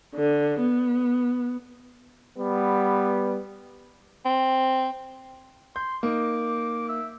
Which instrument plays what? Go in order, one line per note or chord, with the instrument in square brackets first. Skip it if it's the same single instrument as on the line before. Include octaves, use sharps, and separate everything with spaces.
[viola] D3
B3
[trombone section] G3 B3
[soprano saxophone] C4
[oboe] C6 [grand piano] G6
[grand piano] A#3 D#4 [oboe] D6
[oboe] E5